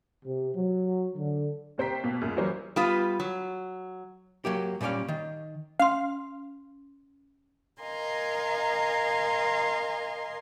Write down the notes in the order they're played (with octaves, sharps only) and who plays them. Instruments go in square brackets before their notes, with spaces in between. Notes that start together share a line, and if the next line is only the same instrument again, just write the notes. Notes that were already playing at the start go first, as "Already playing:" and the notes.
[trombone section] C3
F#3
D3
[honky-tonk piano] D#2 C3 C5 G5 A#5 B6
B2 A#3
C#2 F#2 A#2
E3 F#3 G3 A#4 C5 C#5
[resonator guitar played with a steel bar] G3 B3 F4 B4
F#3
[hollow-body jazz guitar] F#3 A#3 G4
A#2 G3 C#4 D5 F5
D#3
[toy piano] C#4 C6 [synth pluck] F5
[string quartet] A#4 D#5 F5 G#5 A#5 C6